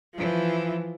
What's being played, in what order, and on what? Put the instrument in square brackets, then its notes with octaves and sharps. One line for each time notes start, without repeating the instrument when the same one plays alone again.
[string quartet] E3 F3